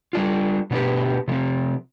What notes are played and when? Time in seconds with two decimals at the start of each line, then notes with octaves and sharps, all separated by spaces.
0.13 G3 D4 F4
0.71 B2 B3 D4 G4 B4
1.28 C3 F3 C4